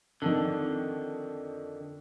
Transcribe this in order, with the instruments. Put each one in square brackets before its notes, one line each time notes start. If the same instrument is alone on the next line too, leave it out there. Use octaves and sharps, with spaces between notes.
[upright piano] F2 D#3 [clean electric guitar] D3